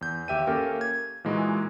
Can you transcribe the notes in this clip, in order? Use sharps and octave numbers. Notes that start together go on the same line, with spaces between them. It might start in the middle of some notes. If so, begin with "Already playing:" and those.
E2 G6
D#2 G4 E5 G5 D#7
A#3 C#4 G4 A4 A#4 F5
G#6
A#2 E3 G#3 D#4 E4 F#4